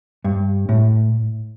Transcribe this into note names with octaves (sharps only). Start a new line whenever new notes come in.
G2
A2